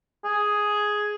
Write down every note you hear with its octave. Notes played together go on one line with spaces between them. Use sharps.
G#4